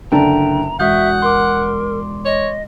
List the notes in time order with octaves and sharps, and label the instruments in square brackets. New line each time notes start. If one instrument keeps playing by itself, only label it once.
[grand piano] F#1 D3 A5 [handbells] G5 [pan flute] A#5
[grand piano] E1 [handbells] F#4 D#6 G6 [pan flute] E5 [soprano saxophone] F#5
[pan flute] A#4 [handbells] C6 D6
[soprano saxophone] C#5 [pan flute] D#5